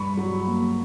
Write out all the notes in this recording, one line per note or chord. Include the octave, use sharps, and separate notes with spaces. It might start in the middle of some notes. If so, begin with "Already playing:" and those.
Already playing: G2 B5 C#6
F#3
A#3